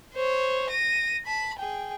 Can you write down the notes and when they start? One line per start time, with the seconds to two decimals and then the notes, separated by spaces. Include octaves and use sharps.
0.13 C5 C#5
0.70 A#6 D#7
1.26 A5 B5
1.59 G#4 G5